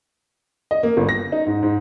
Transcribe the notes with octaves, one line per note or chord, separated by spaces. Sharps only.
D#5
A#3
G1
A#6
D#4
G#2
G#2